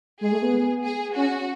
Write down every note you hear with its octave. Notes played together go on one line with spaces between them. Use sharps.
G#3 G#4
A3
B3
G#4
C#4 F#4